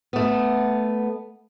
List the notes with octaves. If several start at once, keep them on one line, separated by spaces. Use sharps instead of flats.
A3 B3